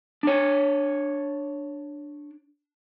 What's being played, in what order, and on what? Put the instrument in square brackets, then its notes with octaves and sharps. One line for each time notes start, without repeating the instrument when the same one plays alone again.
[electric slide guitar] D4 C#5